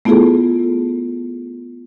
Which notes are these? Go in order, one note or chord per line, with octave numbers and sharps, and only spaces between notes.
A3 B3 E4 F4 G#4 A4